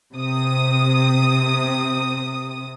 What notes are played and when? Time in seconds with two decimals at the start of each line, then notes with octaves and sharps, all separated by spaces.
0.13 C3 D#6